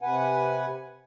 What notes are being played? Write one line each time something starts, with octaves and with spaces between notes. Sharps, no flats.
C3 B4 F#5 G#5